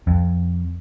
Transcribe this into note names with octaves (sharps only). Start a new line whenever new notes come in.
F2